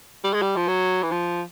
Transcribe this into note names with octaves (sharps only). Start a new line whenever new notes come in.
G3
G#3
G3
F3
F#3
E3
F3